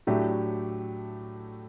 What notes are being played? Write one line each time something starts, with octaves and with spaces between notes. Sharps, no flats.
A2 F#3 A3 D4 G4